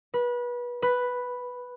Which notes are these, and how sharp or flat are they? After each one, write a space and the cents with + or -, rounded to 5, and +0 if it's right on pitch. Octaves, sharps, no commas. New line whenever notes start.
B4 -25
B4 +0